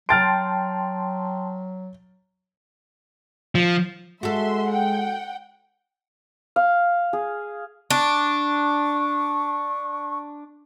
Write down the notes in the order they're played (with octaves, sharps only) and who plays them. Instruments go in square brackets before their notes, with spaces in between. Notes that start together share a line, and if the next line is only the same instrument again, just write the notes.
[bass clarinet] F#3 [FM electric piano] G5 A5 C6 [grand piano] F6 A6 D7
[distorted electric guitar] F3
[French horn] G#3 [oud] F#4 A4 [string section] E5 C6
[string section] F#5 G5
[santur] F5
G#4
[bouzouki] D4 [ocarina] C#6